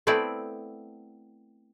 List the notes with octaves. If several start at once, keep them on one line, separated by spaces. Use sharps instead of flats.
A3 B3 C4 E4 D5 E5